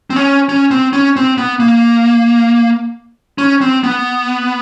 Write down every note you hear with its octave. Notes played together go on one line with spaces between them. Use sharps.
C4
C#4
C#4
C4
C#4
C4
B3
A#3
C#4
C4
B3